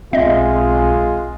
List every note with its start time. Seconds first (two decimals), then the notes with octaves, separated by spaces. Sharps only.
0.13 B1 G#3 C4 F4 D#5 E5